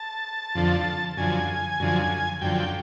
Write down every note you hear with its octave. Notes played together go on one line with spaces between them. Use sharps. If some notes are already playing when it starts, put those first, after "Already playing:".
Already playing: A5
F2 D3 F3
F#2 D3 F3 G#5
F#2 D3 F3
F#2 D3 F3 G5